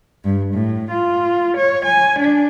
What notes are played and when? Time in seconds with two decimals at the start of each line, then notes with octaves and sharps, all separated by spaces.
0.24 G2
0.53 A2
0.91 F4
1.56 C#5
1.85 G#5
2.18 D4